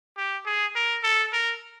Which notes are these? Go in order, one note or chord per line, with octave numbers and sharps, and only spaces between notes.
G4
G#4
A#4
A4
A#4